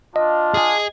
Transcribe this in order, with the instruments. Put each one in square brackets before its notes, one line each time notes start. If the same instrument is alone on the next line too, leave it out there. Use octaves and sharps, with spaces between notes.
[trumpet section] D4 F4 [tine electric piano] D#5
[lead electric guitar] G#4 G#5